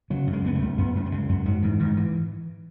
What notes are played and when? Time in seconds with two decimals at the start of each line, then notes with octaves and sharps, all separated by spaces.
0.10 C#3 F#3
0.27 F#2
0.33 G#3
0.44 C#3 B3
0.55 A3
0.61 F#2
0.78 F#2 B3
0.95 F#2 A3
1.06 F#3
1.12 C#3 G#3
1.29 F#2 F#3
1.46 G#2 F#3
1.63 G#2 E3
1.79 G#2 D#3
1.97 E3